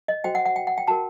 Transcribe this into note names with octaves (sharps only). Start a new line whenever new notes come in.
D#5
F#4 C5 G5
F#5
F#5
G5
F#5
G5
F#4 A#4 A5